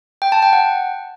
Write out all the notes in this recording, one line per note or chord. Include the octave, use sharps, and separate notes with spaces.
G5
A5
G5
F#5